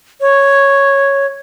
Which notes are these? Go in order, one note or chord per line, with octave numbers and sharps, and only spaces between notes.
C#5